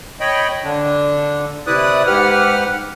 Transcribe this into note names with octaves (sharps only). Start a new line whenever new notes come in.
C#5 D#5 G5 B5
D3 D4
C3 E4 B4 D5 D#6 F#6
G#2 G4 B4 F#5 F6